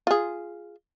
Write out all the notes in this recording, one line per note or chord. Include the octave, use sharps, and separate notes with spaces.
F4 G#4